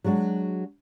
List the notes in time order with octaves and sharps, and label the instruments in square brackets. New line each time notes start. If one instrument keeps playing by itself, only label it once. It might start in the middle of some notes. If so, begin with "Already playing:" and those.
[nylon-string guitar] F#3 G#3 D4 F#4